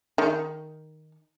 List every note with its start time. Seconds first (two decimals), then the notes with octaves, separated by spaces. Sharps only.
0.18 D#3